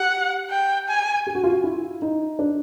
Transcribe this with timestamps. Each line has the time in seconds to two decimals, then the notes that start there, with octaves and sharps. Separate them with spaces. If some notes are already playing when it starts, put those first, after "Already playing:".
Already playing: G4 F#5
0.51 G5
0.88 G#5
1.27 G4
1.35 F#4
1.44 F4
1.52 F#4
1.64 E4
2.02 D#4
2.39 D4